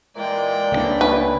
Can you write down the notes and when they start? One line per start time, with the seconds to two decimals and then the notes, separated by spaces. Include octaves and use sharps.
0.16 A#2 E3 G#3 D5 G5
0.71 C#2 A2 E3 F#3 A#3 D4
1.01 B4